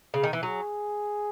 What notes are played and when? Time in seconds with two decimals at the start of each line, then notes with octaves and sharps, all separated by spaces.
0.14 C#3
0.23 D#3
0.33 E3
0.43 F#3 G#4